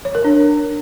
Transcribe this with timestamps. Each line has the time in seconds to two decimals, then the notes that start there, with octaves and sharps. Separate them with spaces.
0.05 C#5
0.15 A#4
0.24 D4